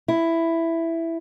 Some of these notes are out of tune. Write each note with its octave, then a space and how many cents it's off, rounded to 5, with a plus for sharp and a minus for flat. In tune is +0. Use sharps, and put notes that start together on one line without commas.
E4 +5